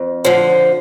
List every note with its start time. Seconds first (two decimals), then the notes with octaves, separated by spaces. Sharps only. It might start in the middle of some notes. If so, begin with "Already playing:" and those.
Already playing: F2
0.25 D3 F3